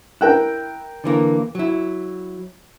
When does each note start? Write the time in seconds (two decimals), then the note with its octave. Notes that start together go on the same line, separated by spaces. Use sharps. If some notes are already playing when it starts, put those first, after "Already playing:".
0.21 E4 A#4 G5 F#6
1.04 D3 E3 A#3
1.55 F#3 E4